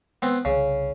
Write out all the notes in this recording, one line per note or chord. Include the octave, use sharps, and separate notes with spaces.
B3 C4
C2 C#3